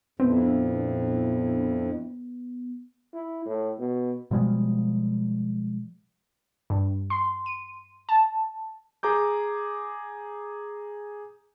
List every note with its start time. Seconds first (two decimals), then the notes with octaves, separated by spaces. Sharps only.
0.20 F2 A#2 B3 C4 D4 E4
3.14 E4
3.46 A2
3.80 B2
4.31 B2 F3 G3 G#3
6.70 G2
7.10 C6
7.46 D#7
8.09 A5
9.03 G#4 A#5 D6 G6